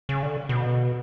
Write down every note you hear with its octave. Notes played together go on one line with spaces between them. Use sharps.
C#3
D3
B2